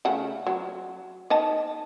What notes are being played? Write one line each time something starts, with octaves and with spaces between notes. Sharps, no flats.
C#3 A3 F#5
F#3
D#4 D#5 A5